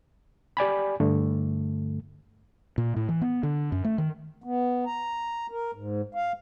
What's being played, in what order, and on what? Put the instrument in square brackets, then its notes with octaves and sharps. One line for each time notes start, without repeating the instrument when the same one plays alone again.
[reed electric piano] G4 D5 G#5 B5
G2 D3 A3
[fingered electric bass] A#2
A2
E3
B3
D3
F#2
A3
D#3
[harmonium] B3
A#5
A#4
G#2
F5